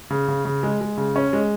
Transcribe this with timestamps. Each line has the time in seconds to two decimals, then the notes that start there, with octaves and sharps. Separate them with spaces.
0.10 C#3
0.28 C#3
0.45 C#3
0.63 G#3
0.81 G#3
0.97 C#3
1.16 C#4
1.33 G#3